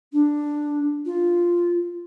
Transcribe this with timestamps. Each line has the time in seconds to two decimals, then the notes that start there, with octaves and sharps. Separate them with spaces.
0.12 D4
1.05 F4